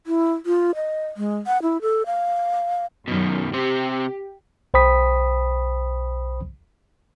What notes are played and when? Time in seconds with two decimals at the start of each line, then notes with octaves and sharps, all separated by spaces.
0.07 E4
0.46 F4
0.75 D#5
1.17 G#3
1.47 F#5
1.62 E4
1.82 A4
2.06 F5
3.08 F#2 B2 D#3
3.53 C3 C4 G4
4.74 B1 C5 G5 B5 D#6 B6